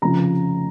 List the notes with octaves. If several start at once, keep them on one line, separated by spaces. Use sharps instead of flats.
F1 F2 C#3 F3 A#5